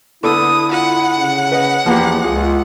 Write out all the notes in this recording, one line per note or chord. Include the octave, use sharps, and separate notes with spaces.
D3 B3 E4 A4 D#6
F4 F#5
C#3
B4 D#5
E2 F3 A#3 B3 G4
C#2 F4 G#4